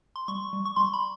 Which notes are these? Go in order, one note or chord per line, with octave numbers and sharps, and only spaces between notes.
C6
G3 C#6
G3
C#6
G3 C6
B5